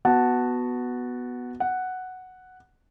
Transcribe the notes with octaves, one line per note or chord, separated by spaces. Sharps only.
B3 F#4 F#5 A5
F#5